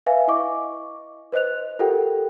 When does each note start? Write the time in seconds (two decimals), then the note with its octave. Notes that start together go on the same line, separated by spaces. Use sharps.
0.06 B4 E5 F5 G#5
0.28 E4 D#5 C#6 D6
1.32 B4 C5 D#5 F#6 F7
1.79 F4 G4 A4 A#4 F#5 G5